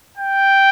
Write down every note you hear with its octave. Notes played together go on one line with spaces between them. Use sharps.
G5